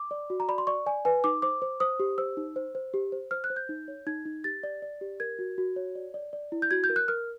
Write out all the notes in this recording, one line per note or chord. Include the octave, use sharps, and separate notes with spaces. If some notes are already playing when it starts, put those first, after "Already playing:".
Already playing: D6
D5
F#4
A#5
D5 B5
C6
D5 C#6
D5 G#5
B4 G#5
D#4 D6
C5 D6
C5
C5 D#6
G4
C5 E6
D#4
C5
C5
G4
C5
C5 F6
F#6
C5
G6
D#4
C#5
D#4 G#6
D#4
G4 A6
D5
D5
G4
A#4 G#6
F#4
F#4
C#5
D5
D5
D5
E4
G6
F#4 G#6
G6
A#4
F#6
A#4 F6